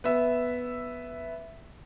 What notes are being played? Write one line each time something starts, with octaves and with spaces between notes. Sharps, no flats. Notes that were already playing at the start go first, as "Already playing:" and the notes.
B3 E5